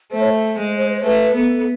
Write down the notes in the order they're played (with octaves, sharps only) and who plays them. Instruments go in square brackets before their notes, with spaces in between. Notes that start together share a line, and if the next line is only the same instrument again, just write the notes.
[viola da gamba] A3 [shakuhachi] C5
[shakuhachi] C#5
C5
[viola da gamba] G#3
[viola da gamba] A3 [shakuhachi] B4
[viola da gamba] B3 [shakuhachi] A4